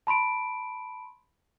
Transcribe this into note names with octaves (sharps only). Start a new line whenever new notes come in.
A5 B5 C6 D7